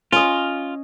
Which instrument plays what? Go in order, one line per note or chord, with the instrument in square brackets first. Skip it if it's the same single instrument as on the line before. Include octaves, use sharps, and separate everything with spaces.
[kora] C#4 D#5 [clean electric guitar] F4